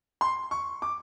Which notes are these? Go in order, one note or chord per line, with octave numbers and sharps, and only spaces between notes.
C6
C#6
D6